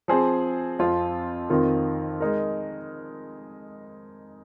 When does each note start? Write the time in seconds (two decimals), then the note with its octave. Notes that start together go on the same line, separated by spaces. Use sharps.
0.08 F3 C4 G#4 C5
0.79 F2 F3 C4 F4
1.50 F2 D#3 C4 F4 A#4
2.20 G#3 D#4 A#4